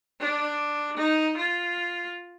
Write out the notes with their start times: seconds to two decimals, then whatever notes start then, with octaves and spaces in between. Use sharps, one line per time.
0.20 D4
0.97 D#4
1.37 F4